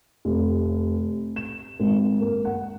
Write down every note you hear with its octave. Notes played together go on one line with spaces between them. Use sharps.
F1
E7
G#1
A#3
F#5